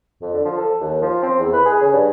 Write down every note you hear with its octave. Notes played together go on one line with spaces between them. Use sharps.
F2
D3
F3
A4
D#2
F3
C4
E2
B4
G#4
C#3
G2